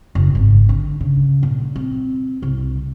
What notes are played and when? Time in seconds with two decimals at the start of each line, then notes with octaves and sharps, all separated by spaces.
0.15 F#1
0.35 G#1
0.69 D3
1.01 C#3
1.43 A#2
1.76 C4
2.42 C2